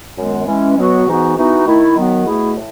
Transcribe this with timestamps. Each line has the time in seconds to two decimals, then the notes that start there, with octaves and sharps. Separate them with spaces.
0.16 F#2 D#3 G#3 B3
0.46 E3 G#3 C#4
0.76 B2 F#3 B3 F#4
1.06 G#2 E3 B3 D#4 F#4
1.36 E3 B3 D#4 F#4
1.66 D#3 A3 E4
1.96 D#3 F#3 B3 F#4
2.25 B2 A3 E4 G#4
2.56 A2